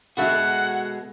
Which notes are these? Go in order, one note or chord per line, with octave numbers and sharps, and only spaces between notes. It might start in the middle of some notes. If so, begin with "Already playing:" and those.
B2 G#3 F#4 A4 E5 F#5